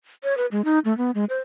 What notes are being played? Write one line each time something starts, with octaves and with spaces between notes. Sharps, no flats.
C#5
B4
G#3
D#4
A3
B3
G#3
C5